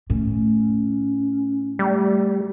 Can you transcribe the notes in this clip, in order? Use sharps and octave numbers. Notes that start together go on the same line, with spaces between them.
A2 C#4
G3 A3